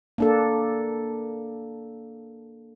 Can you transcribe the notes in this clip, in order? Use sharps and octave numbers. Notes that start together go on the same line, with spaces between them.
A#3 D4 A4